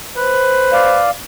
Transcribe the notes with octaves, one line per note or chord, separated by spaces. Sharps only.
B4 C5
D5 F5